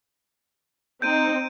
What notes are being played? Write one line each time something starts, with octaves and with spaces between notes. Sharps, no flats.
C4 D#4 G6 D7 D#7